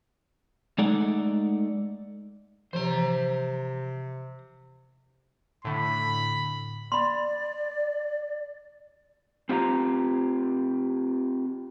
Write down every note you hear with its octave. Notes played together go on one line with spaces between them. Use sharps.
G#3 A3 D#4 A4 D5 F#5
C3 E3 F3 C5 A#5
A2 D3 B5
D5 B5 C6
C4 F4 G4 D#5 A#5